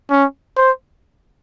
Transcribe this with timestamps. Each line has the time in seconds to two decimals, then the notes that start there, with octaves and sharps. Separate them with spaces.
0.10 C#4
0.57 C5